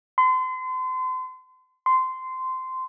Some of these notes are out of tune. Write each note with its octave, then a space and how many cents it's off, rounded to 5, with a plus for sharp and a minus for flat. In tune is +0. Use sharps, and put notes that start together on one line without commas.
C6 -35
C6 -15